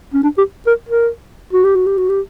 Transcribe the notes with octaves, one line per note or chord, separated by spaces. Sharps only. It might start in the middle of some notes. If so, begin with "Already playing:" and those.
C#4
D4
G4
A#4
A#4
F#4
G4
F#4
G4
F#4
G4